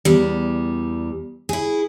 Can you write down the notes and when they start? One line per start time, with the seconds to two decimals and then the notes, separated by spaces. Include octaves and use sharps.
0.05 E2 G3
1.49 E4 G#4